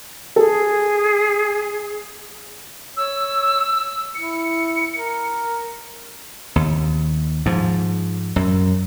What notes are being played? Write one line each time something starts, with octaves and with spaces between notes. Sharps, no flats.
G#4 A4
C#5 E6
E4 C#7
A#4
D#2
G#2 F3
F#2